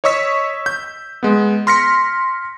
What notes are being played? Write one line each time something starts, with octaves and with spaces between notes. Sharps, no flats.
C#5 D#5 C#6 E6 B6
G6
G#3 B3
C6 F6 A#6 B6 C#7